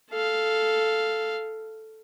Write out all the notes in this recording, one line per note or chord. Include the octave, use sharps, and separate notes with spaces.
A4 F5